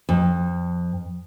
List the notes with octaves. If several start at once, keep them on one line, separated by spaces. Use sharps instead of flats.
F2